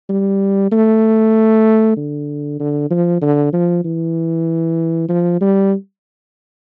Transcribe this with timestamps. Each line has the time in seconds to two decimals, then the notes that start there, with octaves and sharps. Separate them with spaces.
0.10 G3
0.72 A3
1.97 D3
2.60 D3
2.91 F3
3.22 D3
3.53 F3
3.85 E3
5.09 F3
5.41 G3